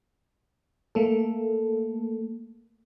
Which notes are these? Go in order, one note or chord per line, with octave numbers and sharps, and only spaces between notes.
A3 A#3 A4